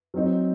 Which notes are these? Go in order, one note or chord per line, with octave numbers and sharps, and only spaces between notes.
F#3 C4 D#4